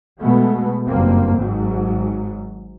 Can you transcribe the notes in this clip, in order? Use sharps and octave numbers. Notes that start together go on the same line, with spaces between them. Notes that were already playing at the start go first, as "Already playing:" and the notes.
B2 G#3 A3 B3
F#1 G2 A#3 C4
G#1 G#2 F#3